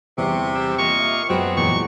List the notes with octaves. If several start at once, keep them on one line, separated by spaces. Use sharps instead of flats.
G1 E2 C3 C#6
E3 G3 E5
A#3 F4 D#5 C#6
E5 D6
F#2 B2 F#3 G#3 B3 C4 F#4
E2 A#2 G#3 C#6